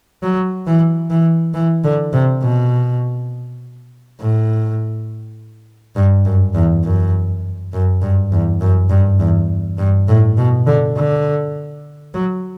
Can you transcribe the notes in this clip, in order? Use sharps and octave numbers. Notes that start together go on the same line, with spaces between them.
F#3
E3
E3
E3
D3
C3
B2
A2
G2
F#2
E2
F#2
F#2
G2
E2
F#2
G2
E2
G2
A2
B2
D3
D3
F#3